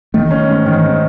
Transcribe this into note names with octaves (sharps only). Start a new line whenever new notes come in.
D#3 A3
C#4
G#2
D#3
G#2